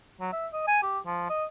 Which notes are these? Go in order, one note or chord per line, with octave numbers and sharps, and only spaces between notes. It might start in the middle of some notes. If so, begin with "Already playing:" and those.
F#3
E5
D#5
G#5
G4
F3
D#5